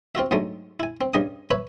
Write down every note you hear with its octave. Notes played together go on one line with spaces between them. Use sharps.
C4 F4 F#4 E5
G#2 D3 F#3 G#3 A3
E4 G#5
C4
G2 C#3 D#5 G#5 D#6
B4 C#5 E5 B5